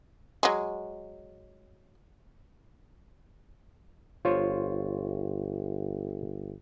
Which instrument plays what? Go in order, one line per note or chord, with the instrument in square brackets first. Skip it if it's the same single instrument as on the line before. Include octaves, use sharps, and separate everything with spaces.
[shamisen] F#3 G#3
[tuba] G1 [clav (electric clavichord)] F4 C5 C#5